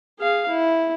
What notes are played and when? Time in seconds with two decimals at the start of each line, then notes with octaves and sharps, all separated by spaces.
0.19 G#4 F5
0.48 E4